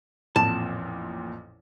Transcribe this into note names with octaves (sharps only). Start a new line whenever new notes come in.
A1 F2 A#2 A5